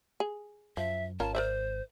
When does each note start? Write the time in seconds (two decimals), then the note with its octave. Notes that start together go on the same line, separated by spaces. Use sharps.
0.20 G#4
0.77 F#2 F3 E5
1.20 G#1 C#4 F4 A#4 A5
1.35 A#4 C5 D5 E5